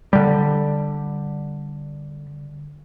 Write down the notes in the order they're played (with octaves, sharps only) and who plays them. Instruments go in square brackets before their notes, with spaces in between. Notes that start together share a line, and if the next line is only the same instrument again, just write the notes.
[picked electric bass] D3 G3